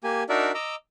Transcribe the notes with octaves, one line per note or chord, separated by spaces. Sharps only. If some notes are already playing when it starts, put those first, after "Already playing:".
A#3 G4 G#5
D4 D#4 F#4 A#4 D5 E5
D#5 A#5 D6 E6